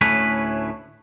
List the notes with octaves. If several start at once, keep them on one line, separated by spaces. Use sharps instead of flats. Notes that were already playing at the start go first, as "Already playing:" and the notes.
D2 A2 A3 C#4 E4 B4